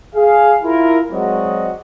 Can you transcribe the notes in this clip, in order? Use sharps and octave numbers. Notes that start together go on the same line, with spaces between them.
G#4 F5
E4 F4 A#4
F#3 G#3 C4 F#4 D5 D#5